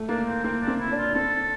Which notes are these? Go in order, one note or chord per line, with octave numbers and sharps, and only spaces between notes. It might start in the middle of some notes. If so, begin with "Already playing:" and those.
Already playing: A3
A#3 D4
C4
A#3 C4
D4
C4
E4
D4
F4
C4 A4